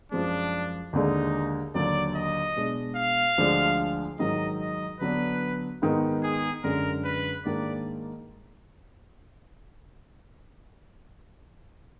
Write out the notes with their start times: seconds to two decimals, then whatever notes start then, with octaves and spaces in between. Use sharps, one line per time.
0.12 F#2 F3 G#3 D4
0.93 D#2 D3 G#3 D#4
1.74 D#2 D3 F#3 D5
2.16 D#5
2.56 B2 G#3 D4
2.97 F5
3.38 D2 D3 F3 G#3 D4
4.19 G#2 D#3 F#3 D#5
4.60 D#5
5.00 D3 F#3 B3 D4 B4
5.82 G#2 D#3 G#3 B3 D#4
6.23 G#4
6.64 F#2 D3 G#3 A#4
7.04 B4
7.45 G#2 D#3 A#3 D4 D5